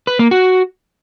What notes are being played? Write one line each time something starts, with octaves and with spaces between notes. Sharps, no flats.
B4
A#3
F#4